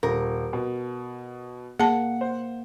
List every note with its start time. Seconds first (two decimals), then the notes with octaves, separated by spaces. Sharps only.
0.03 D#1 A#4
0.53 B2
1.79 A#3 G#4 F#5 A5
2.21 C5